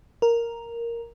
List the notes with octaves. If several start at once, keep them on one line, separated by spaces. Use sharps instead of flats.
A#4